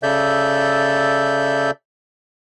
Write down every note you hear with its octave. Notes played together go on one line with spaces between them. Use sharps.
C#3 A4 D5 E5 G6